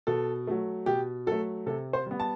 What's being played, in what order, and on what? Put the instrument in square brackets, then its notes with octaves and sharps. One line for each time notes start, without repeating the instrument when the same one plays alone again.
[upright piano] B2 A4
F#3 A3
B2 G4
F#3 A3 A4
C3 A4
C5
G3 B3
A5